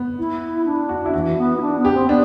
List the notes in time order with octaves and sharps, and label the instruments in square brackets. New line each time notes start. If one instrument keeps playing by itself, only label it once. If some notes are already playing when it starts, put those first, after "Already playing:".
Already playing: [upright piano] B3
[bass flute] E4
D4
[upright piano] F#4
E4
[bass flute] E3 [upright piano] F#4
[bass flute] B3
E4
D4
B3
[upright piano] G4
[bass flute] C4
[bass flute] B3 [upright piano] D4